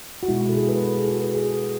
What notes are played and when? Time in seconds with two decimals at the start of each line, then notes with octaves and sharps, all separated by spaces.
0.23 F#4
0.28 B2 G#3 E4
0.41 F#4
0.49 A4
0.55 G#4
0.69 B4
0.83 A4
0.96 G#4
1.08 F#4
1.21 B4
1.35 G#4